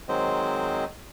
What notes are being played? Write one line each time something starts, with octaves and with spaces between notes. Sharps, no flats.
D#3 F#3 G#3 C4 C5 D#5